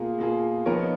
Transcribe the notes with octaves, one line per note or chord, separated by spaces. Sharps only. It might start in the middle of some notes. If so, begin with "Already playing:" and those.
Already playing: B2 A#3 F4 G#4
B2 A#3 F4 G#4
F3 B3 D#4 A#4 C#5